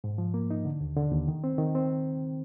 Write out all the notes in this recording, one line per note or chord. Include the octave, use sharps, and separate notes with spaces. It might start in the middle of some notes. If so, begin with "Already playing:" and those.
G#2
F3
A#3
D#4
D3
D#2
D3
D#2
D#3
C4
D#3
C4